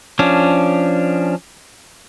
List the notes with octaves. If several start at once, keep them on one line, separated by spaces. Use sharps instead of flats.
F3 C#4 D4